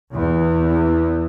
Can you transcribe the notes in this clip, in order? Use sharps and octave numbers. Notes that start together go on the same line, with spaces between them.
E2